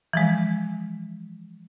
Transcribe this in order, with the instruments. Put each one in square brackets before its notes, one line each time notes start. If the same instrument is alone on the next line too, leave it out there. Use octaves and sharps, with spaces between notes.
[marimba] E3 F3 G#3